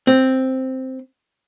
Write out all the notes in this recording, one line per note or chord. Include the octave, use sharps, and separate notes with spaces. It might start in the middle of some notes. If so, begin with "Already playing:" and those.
C4